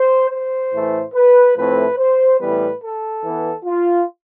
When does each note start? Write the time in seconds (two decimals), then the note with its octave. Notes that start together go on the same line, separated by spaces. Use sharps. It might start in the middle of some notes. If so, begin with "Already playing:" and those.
Already playing: C5
0.30 C5
0.72 A2 E3 A3
1.14 B4
1.56 A2 F3 A3 C4 B4
1.97 C5
2.39 A2 E3 G3 B3 B4
2.82 A4
3.23 E3 B3
3.65 F4